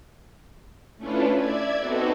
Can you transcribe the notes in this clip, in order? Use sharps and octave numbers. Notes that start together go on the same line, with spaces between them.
A3 C#4 D4 E4 F4 B4
D5 E5 G#6
B3 C4 D#4 F#4 A4